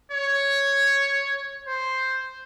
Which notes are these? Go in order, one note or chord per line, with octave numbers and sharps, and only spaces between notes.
C#5
C5